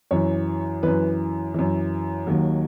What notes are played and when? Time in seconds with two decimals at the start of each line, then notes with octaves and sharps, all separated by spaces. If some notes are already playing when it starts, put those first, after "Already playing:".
0.11 F#2 E3 C#5
0.83 F#2 E3 B4
1.54 F#2 E3
2.27 D#2 D#3 F#3